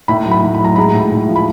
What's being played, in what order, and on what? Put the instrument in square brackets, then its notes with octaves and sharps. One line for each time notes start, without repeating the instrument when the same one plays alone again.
[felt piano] A2 B5
F#3
B5
A2
B5
F#3 A#5
G#3 B5
A2
A2
F3
B5